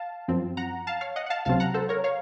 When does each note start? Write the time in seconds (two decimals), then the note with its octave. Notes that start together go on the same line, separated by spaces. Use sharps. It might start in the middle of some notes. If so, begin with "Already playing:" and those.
Already playing: F5 A5
0.28 F#2 F3 C4
0.57 F#5 A#5
0.87 F5 A5
1.01 C#5 F5
1.16 D#5 F#5
1.26 F#5
1.30 F5 A5
1.45 C#2 C3 F#3 C4 F5 A5
1.60 F#5 A#5
1.74 A4 C5
1.89 A#4 C#5
2.04 C#5 F5